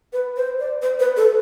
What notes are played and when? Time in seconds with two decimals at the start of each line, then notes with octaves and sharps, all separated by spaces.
0.13 B4
0.36 C5
0.59 D5
0.82 C5
1.00 B4
1.17 A4